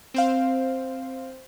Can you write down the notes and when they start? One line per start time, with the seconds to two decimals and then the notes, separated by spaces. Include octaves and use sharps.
0.14 C4 C5 F5